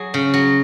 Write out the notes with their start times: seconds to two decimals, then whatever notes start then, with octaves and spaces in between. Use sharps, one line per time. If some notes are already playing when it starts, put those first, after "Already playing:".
Already playing: F#3 G#4
0.14 C#3
0.34 F#3